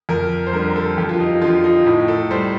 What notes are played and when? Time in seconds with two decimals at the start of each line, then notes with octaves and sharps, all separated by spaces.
0.09 F2 A#4
0.47 C5
0.53 D3 G3 A#4
0.70 A#4
0.76 A4
0.97 F2 G4
1.09 F4
1.20 D#4
1.41 D3 F3 F4
1.64 D#4
1.85 A2 D#4
2.08 A4
2.31 G3 C5